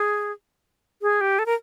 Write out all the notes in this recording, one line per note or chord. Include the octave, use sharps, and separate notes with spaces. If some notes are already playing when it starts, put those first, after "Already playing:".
Already playing: G#4
G#4
G4
A4
A#4